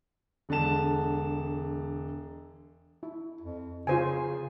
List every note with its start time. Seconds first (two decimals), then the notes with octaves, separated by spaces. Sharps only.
0.49 E1 D3 G#3 A5 E7
3.03 E4
3.41 F2
3.87 C#3 F4 C5 G#5